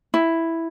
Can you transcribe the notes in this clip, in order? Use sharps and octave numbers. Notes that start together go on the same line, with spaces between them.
E4